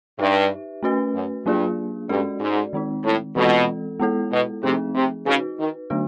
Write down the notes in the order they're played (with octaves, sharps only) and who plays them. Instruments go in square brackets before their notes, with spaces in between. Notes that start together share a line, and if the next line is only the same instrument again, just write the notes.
[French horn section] G2 [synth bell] D#4 G4 B4 E5
[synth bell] A3 C#4 F#4 B4
[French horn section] F#2
[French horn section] G2 [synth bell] F#3 A#3 D4 F4 G#4
[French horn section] G2 [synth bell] G#3 C#4 F#4 A4 D5
[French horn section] G#2
[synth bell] D#3 G#3 C4 D#4
[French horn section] A2
[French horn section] B2 [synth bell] E3 G#3 C4 F4 A4
[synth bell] G#3 B3 E4 A4
[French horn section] B2
[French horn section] C3 [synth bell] F3 A3 C4 D#4 G#4
[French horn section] C3
[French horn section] C#3 [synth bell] D#4 F#4 B4
[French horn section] D#3
[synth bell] D3 F#3 A3 D4 F#4